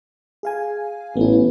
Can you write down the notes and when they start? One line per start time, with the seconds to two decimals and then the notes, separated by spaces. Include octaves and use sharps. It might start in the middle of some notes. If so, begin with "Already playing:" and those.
0.43 G#4 F5 G#5
1.17 A1 B3 E4